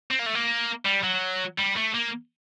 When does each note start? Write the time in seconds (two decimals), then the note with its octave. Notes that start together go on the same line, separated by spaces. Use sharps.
0.11 C4
0.20 A#3
0.26 A3
0.35 A#3
0.85 G3
1.03 F#3
1.58 G3
1.77 A3
1.94 A#3